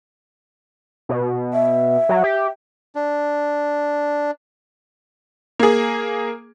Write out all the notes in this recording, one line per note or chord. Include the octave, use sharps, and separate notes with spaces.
B2
E5
F#3
G4
D4
A#3 G#4